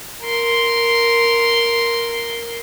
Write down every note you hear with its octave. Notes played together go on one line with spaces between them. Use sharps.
A#4 C6